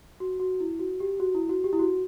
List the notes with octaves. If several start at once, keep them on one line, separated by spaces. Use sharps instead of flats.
F#4
F#4
E4
F#4
G4
F#4
E4
F#4
G4
E4
F#4